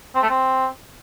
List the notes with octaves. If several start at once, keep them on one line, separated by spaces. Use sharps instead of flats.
C4
A3
C4